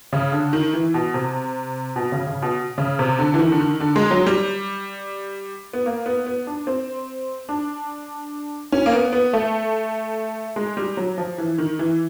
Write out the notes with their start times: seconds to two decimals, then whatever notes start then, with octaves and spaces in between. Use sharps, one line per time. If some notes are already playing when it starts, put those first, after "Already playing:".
0.13 C#3
0.32 D3
0.53 D#3
0.73 E3
0.94 B2
1.14 C3
1.96 B2
2.12 C#3
2.27 C#3
2.42 B2
2.78 C#3
2.99 C3
3.19 D3
3.34 E3
3.39 D#3
3.52 D3
3.60 D#3
3.80 D3
3.96 G#3
4.11 F#3
4.27 G3
5.73 B3
5.86 A#3
6.06 B3
6.26 B3
6.47 D4
6.67 C4
7.49 D4
8.72 C#4
8.86 A#3
8.92 B3
9.13 B3
9.33 A3
10.56 G#3
10.77 G3
10.97 F#3
11.18 F3
11.38 E3
11.58 D#3
11.79 E3